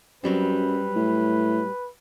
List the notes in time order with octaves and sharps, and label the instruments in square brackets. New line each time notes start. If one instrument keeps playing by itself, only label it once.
[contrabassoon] F#2 [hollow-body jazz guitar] F#3 G3 C4 [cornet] B4
[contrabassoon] A2